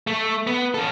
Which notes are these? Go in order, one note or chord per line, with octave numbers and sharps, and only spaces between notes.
A3
B3
C#4 A4